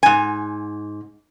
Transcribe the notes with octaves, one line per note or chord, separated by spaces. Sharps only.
G#2 G#5